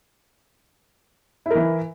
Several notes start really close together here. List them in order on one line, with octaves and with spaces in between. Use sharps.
E4 A#4 E3